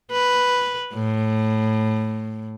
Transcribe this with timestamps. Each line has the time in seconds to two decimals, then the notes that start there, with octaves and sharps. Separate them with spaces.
0.12 B4
0.94 A2